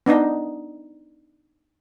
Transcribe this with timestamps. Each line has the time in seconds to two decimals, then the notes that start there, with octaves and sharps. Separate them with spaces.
0.06 B3 D4 D#4 D#5